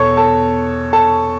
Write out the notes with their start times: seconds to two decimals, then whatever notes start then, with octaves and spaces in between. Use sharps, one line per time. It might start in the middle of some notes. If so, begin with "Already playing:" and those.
Already playing: E2 B2 A4 C#5 A5 C#6
0.17 A4 A5
0.93 A4 A5